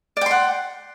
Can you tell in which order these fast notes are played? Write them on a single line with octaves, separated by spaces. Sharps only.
D5 G5 C6 F#5